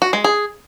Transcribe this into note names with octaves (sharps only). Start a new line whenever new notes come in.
F#4
G#3
G#4